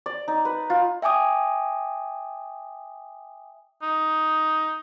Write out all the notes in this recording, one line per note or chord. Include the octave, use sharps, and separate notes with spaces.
D5
D#4
B4
F4
E5 G5 G#5 D6 D#6
D#4